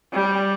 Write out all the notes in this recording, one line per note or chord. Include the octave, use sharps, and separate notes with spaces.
G3